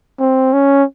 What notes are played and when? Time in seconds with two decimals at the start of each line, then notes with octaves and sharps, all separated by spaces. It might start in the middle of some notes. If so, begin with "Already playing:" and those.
0.20 C4
0.53 C#4